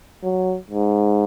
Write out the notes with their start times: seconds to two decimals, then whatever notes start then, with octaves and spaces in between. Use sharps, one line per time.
0.23 F#3
0.70 G#2